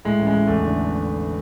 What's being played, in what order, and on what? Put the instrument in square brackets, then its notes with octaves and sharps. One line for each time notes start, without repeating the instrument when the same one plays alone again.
[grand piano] A2 G#3
A1
G#3
A1
E2 A3
D3